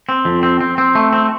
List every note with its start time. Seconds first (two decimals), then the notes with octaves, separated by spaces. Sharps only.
0.09 C4
0.25 F2
0.43 C4
0.61 C4
0.78 C4
0.95 A3
1.13 C4